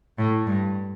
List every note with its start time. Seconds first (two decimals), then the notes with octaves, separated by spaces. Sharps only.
0.18 A2
0.47 G2